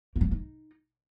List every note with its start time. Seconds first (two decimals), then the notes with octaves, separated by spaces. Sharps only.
0.16 A#3
0.21 G3
0.26 A#3
0.31 D#4